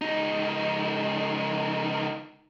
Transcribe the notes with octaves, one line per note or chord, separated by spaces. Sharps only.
C#2 D#4